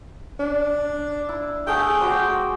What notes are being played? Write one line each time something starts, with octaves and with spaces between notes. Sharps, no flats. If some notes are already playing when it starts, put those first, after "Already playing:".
D4
E4
A3 G#4 F#5 G5
F#4 D5 C6